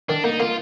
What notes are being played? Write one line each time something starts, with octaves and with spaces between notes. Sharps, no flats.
D#3 D4
A#3 D#4
A#3 F4